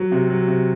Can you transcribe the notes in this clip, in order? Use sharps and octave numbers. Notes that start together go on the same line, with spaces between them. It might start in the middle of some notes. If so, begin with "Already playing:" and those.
Already playing: F#3
C3
F#3
C3